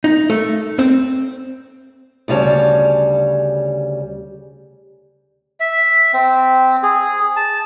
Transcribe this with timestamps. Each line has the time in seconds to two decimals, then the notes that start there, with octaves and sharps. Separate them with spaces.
0.04 D#4
0.30 A3
0.79 C4
2.28 D2 C#3 G3 C#5 A5
5.60 E5
6.13 C4
6.83 G#4
7.36 A5